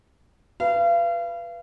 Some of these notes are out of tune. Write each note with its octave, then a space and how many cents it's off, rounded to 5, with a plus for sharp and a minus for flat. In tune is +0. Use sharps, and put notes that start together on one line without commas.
B4 -10 F5 -35